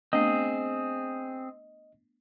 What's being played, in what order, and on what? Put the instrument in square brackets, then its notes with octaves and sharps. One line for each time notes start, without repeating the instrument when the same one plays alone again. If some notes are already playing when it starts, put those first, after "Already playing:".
[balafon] A3 B3 D4 [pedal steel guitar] C4 G#4 [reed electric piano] D#5